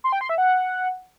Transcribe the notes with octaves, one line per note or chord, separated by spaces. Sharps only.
C6
G5
C6
E5
F#5